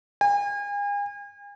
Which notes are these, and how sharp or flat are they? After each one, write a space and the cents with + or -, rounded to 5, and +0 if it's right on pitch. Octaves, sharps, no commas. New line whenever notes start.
G#5 -40